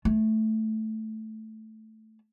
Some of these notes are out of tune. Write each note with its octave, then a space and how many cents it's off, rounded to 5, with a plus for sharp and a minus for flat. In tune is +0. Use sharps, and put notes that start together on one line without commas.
A3 -5